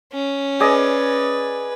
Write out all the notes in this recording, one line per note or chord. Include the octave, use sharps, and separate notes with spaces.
C#4
G#4 B4 D5 D#5